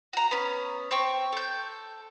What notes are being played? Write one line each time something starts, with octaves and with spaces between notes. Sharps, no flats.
F#4 A#5
B3 C#4
C4 G5 C#6
A4 G6